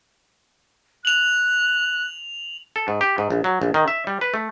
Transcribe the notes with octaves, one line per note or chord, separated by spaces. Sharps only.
F#6 F7 F#7
A4
G#2
G4
G#2
A#1
F#3
A#1
D#3
E5
G3
B4
A3